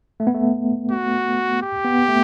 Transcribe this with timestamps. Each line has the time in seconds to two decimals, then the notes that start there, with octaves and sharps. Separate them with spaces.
0.20 A3
0.27 B3
0.34 A3
0.91 F#4
1.62 G4
1.85 B3
2.08 A3